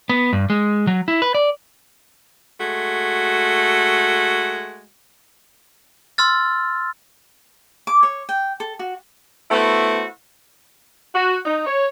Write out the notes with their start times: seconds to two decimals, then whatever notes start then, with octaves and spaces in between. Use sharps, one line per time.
0.09 B3
0.33 G2
0.50 G#3
0.87 F#3
1.08 E4
1.22 B4
1.35 D5
2.61 G#3 A3 F#4
6.18 C6 E6 F6 A6
7.87 D6
8.03 C#5
8.29 G5
8.60 A4
8.79 F#4
9.51 A3 B3 E4 F#4 C5
11.14 F#4
11.46 D#4
11.65 C#5